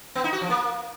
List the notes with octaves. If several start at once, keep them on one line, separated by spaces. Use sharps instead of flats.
B3
D#4
F#4
F3
A#3